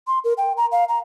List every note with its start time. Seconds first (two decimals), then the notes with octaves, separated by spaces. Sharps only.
0.07 C6
0.24 A#4
0.38 G5
0.57 A#5
0.72 F5
0.89 A#5